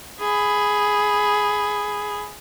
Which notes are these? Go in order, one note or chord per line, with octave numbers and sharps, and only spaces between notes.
G#4 B5